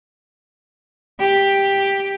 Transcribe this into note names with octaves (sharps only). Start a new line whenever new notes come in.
G4